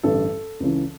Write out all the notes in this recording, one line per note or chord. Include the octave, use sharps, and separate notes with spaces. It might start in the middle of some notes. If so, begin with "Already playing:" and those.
A1 G2 D3 A4
C#2 C#3 E3